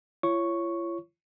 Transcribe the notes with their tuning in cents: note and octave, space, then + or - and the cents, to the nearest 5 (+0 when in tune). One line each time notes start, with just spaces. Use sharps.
F4 -45 C#5 +0 C#6 +0